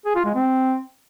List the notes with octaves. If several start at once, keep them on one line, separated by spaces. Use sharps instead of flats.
G#4
F4
G#3
C4